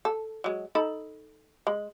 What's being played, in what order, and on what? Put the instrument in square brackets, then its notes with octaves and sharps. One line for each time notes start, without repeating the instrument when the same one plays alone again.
[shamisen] A4
F#3 G#3
D#4 A4 B5
G#3